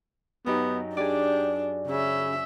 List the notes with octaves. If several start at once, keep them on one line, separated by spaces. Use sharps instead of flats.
F#2 B3 D#4 G4
D4 G4 G#4 D5
C#3 C#4 E5